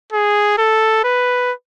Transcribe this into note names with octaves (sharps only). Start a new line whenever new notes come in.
G#4
A4
B4